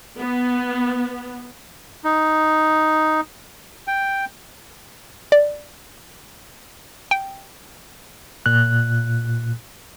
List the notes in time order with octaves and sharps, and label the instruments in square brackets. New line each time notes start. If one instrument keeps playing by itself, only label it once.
[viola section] B3
[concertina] D#4
G5
[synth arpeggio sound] D5
G5
[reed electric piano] A#2 F#6